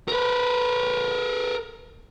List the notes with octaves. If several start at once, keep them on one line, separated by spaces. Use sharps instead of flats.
A#4 B4